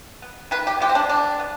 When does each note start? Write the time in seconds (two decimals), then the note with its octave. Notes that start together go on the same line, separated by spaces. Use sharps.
0.22 B3
0.51 D#3 B4
0.67 G4
0.80 G#3 B3 G4
0.89 C4
0.95 D4
1.09 D3 D4
1.40 B3